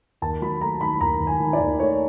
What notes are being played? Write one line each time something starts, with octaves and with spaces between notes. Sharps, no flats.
D#2 A5
F#3 B5
A3 A#5
D#3 B5
D#2 A#5
D#2
G#5
D#3
D5
D#2
A3 C#5